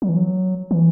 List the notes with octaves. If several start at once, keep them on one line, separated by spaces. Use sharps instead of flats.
F#3
E3
F#3
E3